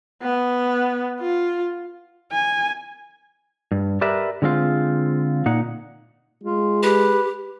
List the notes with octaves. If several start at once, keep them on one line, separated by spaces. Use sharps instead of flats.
B3
F4
G#5
G2
G4 A#4 B4 D5 E5
D3 G#3 C4 F4
A#2 D#4 F#5
G#3 F4
G4 B4